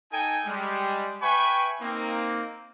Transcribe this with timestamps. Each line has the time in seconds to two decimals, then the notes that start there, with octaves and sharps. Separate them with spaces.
0.12 D#4 A4 G5 G#5
0.46 G3 G#3
1.21 B4 E5 G5 G#5 B5 C#6
1.81 A#3 C4 D#4